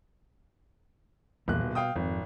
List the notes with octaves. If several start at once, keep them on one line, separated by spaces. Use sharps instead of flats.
D#1 B1 E2 A#3 F#6
B2
F5 G5 D#6
G#1 F2